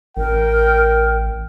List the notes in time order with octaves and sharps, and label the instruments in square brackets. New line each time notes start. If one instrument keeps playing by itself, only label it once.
[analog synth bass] A1 [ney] A#4 [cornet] G5